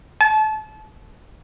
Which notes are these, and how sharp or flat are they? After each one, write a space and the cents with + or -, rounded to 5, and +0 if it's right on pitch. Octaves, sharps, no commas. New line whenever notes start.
A5 -30